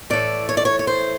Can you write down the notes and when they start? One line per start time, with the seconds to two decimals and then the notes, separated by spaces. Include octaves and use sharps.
0.10 A2 E3 A3 D5
0.49 C#5
0.57 D5
0.65 C#5
0.79 C#5
0.87 C5